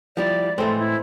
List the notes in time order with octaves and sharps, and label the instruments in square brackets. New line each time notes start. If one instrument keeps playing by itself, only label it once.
[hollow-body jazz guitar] F3 G3 E4 [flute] D5
[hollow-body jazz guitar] A2 A3 [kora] E3 G#3 C4 [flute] A4
[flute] E4